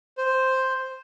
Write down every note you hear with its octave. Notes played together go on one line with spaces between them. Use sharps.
C5